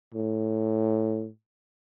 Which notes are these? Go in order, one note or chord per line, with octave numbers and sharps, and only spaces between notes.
A2